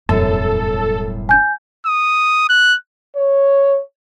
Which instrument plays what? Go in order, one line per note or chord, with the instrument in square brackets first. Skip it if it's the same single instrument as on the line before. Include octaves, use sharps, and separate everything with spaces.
[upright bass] E1 G3 [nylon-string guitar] F#2 A2 C#5 [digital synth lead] A4
[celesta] G#5 G6
[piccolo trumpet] D#6
F#6
[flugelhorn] C#5